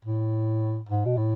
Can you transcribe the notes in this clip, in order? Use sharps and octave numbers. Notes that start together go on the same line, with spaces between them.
A2
G#2
B2
A2